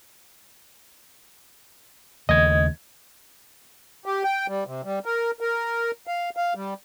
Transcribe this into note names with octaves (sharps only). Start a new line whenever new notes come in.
D#2 C#3 A3 D#5 G#6
G4
G5
G3
C3
G3
A#4
A#4
F5
F5
G3